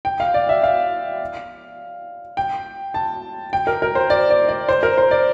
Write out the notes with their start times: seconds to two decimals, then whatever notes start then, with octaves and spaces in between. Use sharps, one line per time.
0.05 G5
0.20 F5
0.34 D5
0.49 E5
0.63 F5
2.37 G5
2.94 A5
3.53 G5
3.67 A#4
3.82 A#4
3.95 C5
4.10 D5
4.30 D5
4.49 D5
4.69 C5
4.83 A#4
4.97 C5
5.11 D5